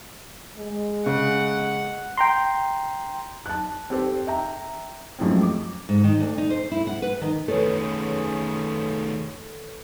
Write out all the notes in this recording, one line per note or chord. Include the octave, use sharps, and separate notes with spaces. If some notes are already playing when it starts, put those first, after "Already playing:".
G#3
C#3 F#5
G5 A#5 C6
A5 F#6
C4 G4 A4 C5
E5 G5 A#5
F#2 A2 F3 G#3 C4
D6
G#2
D#3
D2
D#4
C5
E4
F#5
B4
D#3
D#3 A3 C#4 G#4 A4 B4 C#5